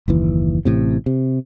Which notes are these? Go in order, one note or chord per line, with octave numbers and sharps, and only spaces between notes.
F#1 D#2 E3
A1 A2 C3
C3